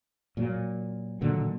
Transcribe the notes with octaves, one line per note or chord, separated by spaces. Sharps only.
A#2 F#3
A#2 D3 D#3 F#3